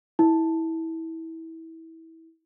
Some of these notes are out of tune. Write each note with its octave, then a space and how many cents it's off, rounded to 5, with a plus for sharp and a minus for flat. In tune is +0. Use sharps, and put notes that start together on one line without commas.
E4 -25